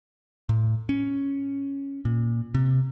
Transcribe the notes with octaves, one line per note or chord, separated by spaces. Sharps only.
A2
C#4
A#2
C3